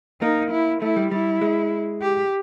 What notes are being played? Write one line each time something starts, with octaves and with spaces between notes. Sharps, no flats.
A#3 D#4
E4
A3 E4
G3
G3 E4
G#3
G4